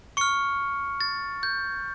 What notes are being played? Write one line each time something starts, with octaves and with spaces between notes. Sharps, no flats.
C#6 F6 C#7
A6
G6